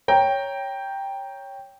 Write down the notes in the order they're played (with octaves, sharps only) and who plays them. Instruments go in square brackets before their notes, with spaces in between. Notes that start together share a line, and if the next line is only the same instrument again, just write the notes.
[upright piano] C#5 G5 A#5